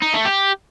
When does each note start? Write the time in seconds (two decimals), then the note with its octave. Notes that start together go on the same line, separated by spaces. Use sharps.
0.02 D#4
0.14 A3
0.25 G4